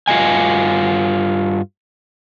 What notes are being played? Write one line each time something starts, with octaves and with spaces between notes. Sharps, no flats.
G2 F4 F#4 D#5 E5 G#5